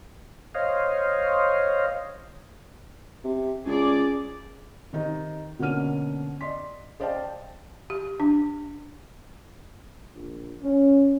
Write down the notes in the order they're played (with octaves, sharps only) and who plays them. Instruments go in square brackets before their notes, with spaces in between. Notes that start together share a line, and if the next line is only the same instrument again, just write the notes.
[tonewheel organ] C5 C#5 D#5 F5
[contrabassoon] C3
[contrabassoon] C#2 [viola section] G#4 D5
[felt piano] C3 D#3 D#4
B2 D3 A#3 C#4 F6 D#7
D5 D#5 C6 B6
C5 D5 D#5 F5 G5 A5
[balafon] G4
D4
[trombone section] A#1
C#4